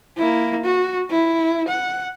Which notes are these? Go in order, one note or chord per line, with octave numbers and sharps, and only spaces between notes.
A#3 E4
F#4
E4
F#5